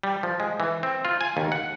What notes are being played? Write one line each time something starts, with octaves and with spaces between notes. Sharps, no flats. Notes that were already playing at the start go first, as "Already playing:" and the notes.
G3
F3
G#3
E3
C4
F4
G#5
D#2
F#5